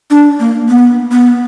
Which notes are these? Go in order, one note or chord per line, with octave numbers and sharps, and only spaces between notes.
D4
A#3
B3
B3